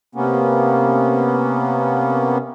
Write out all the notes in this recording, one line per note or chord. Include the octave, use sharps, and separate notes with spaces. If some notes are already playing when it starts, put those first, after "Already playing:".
C3 A#3 B3 C#4